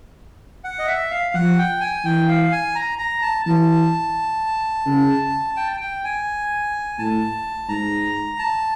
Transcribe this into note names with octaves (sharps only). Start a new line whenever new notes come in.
F#5
D#5
E5
F5
F3 F#5
G5
G#5
E3 G5
F5
G#5
A#5
A#5
A5
E3 A5
C#3
G5
G5
G#5
A2 A5
G#2 A#5
A5